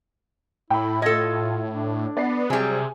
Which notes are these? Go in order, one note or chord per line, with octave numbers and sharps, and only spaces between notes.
A2 E4 G5 B5
F4 A4 D#5 G#6
D4
B3 D5 C7
C3 F#3 G3 G#4 G#5